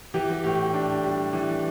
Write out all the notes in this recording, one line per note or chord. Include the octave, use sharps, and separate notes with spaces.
E3 G4
G4
A2 G4
D4
G3
E3